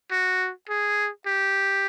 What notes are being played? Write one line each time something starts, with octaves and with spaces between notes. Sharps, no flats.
F#4
G#4
G4